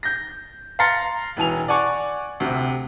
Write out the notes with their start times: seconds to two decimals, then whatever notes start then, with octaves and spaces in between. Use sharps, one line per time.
0.03 G6 A#6
0.79 F5 A#5 C6 A6 A#6 C#7
1.37 E1 E3 G#5 F7
1.68 D5 F#5 G#5 C#6 D6
2.40 D2 C3